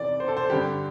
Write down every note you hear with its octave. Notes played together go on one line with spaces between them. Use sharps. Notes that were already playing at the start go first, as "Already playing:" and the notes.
Already playing: E2 C3 E3 D5
C5
A4
C5
G2 D3 G3 G4